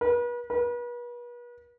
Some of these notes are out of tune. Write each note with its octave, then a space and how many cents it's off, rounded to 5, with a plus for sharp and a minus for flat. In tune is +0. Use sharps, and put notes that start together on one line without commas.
B4 -40
B4 -40